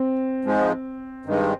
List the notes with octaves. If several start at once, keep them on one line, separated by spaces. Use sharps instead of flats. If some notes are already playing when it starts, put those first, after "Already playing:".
Already playing: C4
G#2 F3 G#3
G2 D#3 G#3